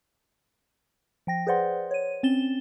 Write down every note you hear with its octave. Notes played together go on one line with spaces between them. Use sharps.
F3 G5 A#6
G#4 B4 C5 D5 F#5 C6
C#5 D#7
C4 C#4 A6 E7 G7